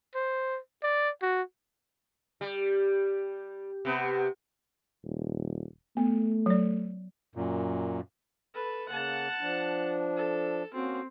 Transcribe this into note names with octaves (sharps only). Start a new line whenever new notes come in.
C5
D5
F#4
G3
C3 B3
D#1
A3 B3
F#3 D5
F#2 A#2
A4 B4
C#3 A#3 F#5 A5
F3 D4
A4
A#3 C4 C#4 F#4